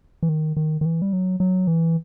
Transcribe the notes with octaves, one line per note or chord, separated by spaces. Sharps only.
E3
D#3
D#3
D#3
E3
G3
F#3
F#3
E3